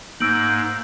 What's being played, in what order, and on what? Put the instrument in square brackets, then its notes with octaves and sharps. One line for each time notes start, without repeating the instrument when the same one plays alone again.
[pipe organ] G#2 [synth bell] A#3 [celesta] E6 D7 F#7 [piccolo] G6